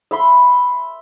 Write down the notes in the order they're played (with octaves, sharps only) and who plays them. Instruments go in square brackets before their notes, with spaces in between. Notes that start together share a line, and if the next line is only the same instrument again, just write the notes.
[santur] E5 B5 C6